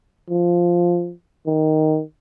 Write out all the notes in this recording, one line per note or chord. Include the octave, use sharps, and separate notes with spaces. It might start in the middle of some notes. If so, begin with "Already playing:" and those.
F3
D#3